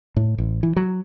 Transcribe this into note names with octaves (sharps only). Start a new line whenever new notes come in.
A2
A1
E3
F#3